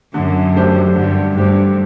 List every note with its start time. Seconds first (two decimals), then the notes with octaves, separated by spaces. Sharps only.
0.14 F#2 D3
0.56 A3 D4 G4 C5
0.96 G2 D3
1.37 G2 A3 D4 G4 C5